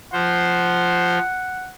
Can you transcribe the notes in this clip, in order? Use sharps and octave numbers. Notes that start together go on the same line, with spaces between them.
F3 C5 F#5